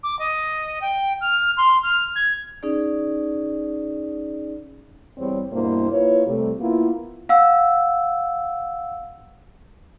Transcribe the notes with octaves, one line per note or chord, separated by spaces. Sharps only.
D6
D#5
G5
F6
C6
F6
G#6
C#4 D#4 G#4 D5
E2 G3 C4 C#5
G2 B2 A#3 D4 E4 C5
A#3 E4 F4 B4 C#5
C3 G3 A3
A#3 B3 E4 F4
F5 F#5 E6